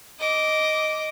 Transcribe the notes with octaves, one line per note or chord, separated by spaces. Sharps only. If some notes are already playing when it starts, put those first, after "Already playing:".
D#5 D6